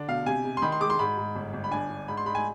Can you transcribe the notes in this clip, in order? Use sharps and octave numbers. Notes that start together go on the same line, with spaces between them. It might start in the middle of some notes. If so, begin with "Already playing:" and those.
Already playing: D3 D4
B2 F5
C3 G#5
C3
C6
D#3 B5
C6
G#3 D6
C6
G#2 B5
G#2
G1
G1
B5
D4 G#5
D4
G#2 B5
C6
G#2 B5
G#5